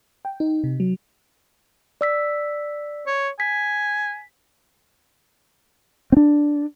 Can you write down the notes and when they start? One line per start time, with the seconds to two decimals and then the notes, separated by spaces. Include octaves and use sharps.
0.25 G5
0.40 D#4
0.64 C3
0.80 F#3
2.01 D5 E6 B6
3.07 C#5
3.40 G#5 B6
6.12 C4 D4